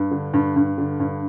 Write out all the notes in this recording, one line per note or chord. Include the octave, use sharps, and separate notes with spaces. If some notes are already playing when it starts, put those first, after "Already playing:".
Already playing: G2
D3
G2
G2
D3
G2